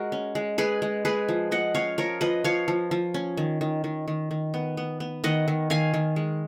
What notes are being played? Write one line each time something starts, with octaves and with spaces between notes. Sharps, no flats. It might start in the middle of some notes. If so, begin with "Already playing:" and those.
Already playing: G#3 F#4 A#4
C#4
G#3
G#3 G#4 B4
G#3
G#3 G#4 B4
F3
F3 D#5 F#5
C#4 C#5 F5
F3 A#4 C#5
F3 B4 D#5
F3 C#5 F5
F3
F3
C#4
D#3
D#3
D#3
D#3
D#3
B3
B3
B3
D#3 D#5 F#5
D#3
D#3 F5 G#5
D#3
G#3